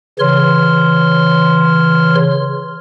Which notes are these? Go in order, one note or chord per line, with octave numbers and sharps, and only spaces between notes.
C#3 E3 C#5 C6 F6